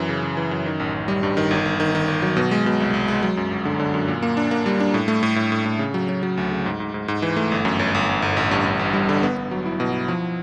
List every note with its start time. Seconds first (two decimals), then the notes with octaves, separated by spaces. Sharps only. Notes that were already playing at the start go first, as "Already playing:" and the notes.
Already playing: F#2 E3
0.09 C#3
0.23 C#3
0.37 E3
0.51 F#2
0.66 D#3
0.80 A1
0.94 A1
1.08 G3
1.23 G2
1.37 D#3
1.51 G1
1.65 G1
1.80 D#3
1.95 D#3
2.08 G1
2.22 F#3
2.37 B2
2.51 G#3
2.66 B2
2.80 C2
2.94 C2
3.08 G#3
3.23 F#3
3.37 F#2
3.51 G1
3.65 D3
3.80 D3
3.94 F#2
4.08 A#2
4.22 A#3
4.37 D4
4.51 A#3
4.66 G3
4.80 D4
4.94 A2
5.08 A3
5.23 A2
5.36 A2
5.52 A2
5.66 A2
5.79 C#3
5.94 F#3
6.09 F#3
6.23 F#3
6.37 D2
6.52 C#3
6.66 G#2
6.80 G#2
6.94 G#2
7.08 G#2
7.22 E3
7.36 A3
7.52 G1
7.65 F#2
7.79 G1
7.95 G1
8.09 G1
8.22 G1
8.37 A1
8.51 G2
8.66 G2
8.79 A1
8.93 G3
9.09 D3
9.23 B3
9.37 B3
9.51 F#3
9.66 E4
9.80 B2
9.93 E4
10.08 F3